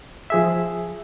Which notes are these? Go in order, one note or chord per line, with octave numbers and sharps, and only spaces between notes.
F3 G#4 E5